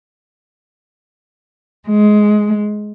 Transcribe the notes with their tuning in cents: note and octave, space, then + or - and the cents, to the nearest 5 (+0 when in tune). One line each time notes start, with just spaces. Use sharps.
G#3 +15